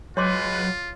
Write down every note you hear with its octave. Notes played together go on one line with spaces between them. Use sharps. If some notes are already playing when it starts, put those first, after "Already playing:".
F#3 G#3 F4 B4 C#5 C6 D6